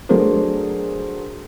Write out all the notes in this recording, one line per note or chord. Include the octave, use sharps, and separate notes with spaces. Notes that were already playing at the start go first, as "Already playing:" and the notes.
F#3 A3 D4 G#4 A#4 C5